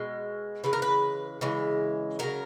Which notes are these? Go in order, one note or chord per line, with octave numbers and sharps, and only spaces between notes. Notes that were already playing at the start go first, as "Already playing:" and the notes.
Already playing: B2 G#3
C#3 E3 G#3 B4
A#4
B4
C#3 E3 G#3
C#3 F#3 A#4